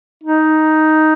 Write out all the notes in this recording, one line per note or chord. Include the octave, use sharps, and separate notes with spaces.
D#4